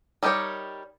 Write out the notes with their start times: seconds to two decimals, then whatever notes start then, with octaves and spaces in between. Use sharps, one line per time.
0.23 G3 D#4 G4 A#4 C#5